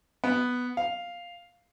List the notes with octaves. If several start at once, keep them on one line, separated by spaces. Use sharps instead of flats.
B3
F5